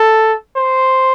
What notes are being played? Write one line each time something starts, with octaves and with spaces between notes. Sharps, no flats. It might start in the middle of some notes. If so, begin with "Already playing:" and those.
Already playing: A4
C5